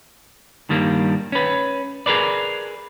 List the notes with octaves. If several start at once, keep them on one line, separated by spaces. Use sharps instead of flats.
G2 D#3 G3 A#3
C#4 B4
G#4 A#4 B4 D5